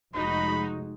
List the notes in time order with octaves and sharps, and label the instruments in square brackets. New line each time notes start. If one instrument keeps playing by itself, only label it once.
[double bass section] F1 G#3 [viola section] D#4 F#4 [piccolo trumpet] B5